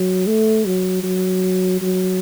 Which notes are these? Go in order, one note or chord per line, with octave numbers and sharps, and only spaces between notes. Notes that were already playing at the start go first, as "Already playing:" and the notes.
Already playing: F#3
A3
F#3
F#3
F#3